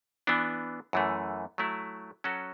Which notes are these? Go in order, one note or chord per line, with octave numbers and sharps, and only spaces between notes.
E3 B3 D4
F#2 E3 A3
F#3 A3 E4
F#3 C#4 F#4 A4